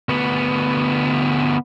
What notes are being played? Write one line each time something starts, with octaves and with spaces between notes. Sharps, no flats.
D2 B3